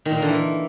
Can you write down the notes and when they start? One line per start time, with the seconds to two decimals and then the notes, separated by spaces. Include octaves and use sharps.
0.05 D#3
0.11 A#2
0.16 A#3
0.22 D3
0.27 E3